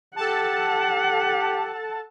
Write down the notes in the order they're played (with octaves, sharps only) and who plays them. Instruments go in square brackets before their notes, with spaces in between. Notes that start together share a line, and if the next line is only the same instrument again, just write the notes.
[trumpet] G4 [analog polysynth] A4 A5 [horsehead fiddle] F#5